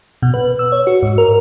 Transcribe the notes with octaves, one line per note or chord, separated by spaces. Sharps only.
B2
B4
E6
C#5
F#4
G#2
A#4